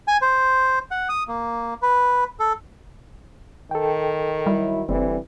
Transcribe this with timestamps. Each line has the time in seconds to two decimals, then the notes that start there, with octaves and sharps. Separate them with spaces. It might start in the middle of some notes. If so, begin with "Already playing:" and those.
0.08 G#5
0.22 C5
0.91 F#5
1.09 D#6
1.28 A#3
1.82 B4
2.40 A4
3.71 D#3 A4 G5
4.47 F#3 G3 E4
4.89 F#1 D3 E3 G3 C4